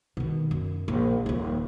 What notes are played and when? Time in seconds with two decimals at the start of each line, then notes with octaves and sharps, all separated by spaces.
0.17 B2 D#3
0.51 F#2
0.88 A#1
1.26 D#1 F4